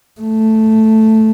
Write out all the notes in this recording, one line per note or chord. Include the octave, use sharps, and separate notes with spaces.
A3